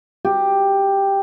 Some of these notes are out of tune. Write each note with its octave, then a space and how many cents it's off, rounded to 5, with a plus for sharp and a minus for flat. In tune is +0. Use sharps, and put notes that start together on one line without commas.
G4 +5